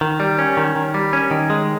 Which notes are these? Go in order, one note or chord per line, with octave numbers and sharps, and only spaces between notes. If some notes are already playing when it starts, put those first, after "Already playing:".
D#3
G3
C#4
D#3
D#3
G3
C#4
D#3
G#3